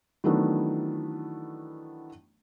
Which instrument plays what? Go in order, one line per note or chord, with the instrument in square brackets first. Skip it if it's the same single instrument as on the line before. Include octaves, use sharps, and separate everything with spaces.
[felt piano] D#3 E3 F#3 A3 B3 D4